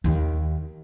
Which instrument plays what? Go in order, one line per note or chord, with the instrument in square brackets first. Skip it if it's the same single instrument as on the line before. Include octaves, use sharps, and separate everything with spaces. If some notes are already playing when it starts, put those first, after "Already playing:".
[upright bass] D#2 D#3